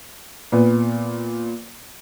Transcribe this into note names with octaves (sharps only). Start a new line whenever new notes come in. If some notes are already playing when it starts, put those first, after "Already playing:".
A#2 B3